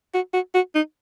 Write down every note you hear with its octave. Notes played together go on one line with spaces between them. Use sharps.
F#4
F#4
F#4
D#4